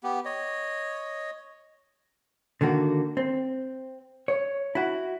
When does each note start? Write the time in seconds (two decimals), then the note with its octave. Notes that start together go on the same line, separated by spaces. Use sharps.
0.04 B3 G4
0.25 C#5 D#5
2.61 D3 D#3 A#3 F#4
3.17 C4
4.28 C#5
4.75 E4 F#4